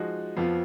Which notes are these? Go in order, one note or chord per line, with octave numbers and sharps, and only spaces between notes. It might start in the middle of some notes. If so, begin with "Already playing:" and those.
Already playing: F3 G#3 D#4 F#4
F2 F3 B3 F4